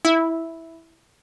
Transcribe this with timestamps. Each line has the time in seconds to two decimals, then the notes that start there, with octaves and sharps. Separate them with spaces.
0.05 E4